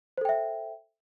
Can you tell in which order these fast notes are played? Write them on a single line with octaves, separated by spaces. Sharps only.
C5 A4 G5 E5